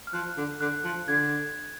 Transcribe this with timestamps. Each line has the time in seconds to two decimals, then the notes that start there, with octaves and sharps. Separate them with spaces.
0.07 F6
0.13 F3 F#6
0.37 D3
0.61 D3 F#6
0.84 F3
1.08 D3 G#6